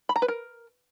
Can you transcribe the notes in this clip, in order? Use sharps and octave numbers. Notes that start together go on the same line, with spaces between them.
B5
A#5
B4
A#4